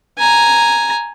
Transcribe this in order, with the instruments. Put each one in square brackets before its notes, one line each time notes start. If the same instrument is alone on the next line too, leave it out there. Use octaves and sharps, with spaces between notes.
[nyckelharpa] G#5 A#5